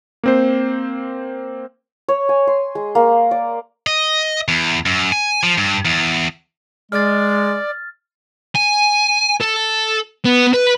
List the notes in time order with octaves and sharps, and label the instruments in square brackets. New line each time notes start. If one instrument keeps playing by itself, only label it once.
[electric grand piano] A#3 C4 C5
[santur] C#5
G#5
C6
G#3
A#3
D5
[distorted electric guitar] D#5
E2
F#2
G#5
F3
G2
E2
[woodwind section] G#3 [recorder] D5 [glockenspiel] F6 A6
[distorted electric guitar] G#5
A4
B3
B4